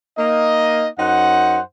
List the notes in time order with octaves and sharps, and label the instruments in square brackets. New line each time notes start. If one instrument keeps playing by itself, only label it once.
[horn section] A#3 D#4 D#5
F#2 D#4 C5 F#5